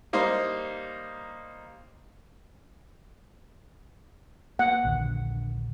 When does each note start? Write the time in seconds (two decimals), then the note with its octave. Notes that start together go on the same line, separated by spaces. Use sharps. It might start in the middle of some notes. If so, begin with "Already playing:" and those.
0.13 G3 A#3 D#4 C5
4.59 A#3 F#5
4.84 A#1 D#2 D3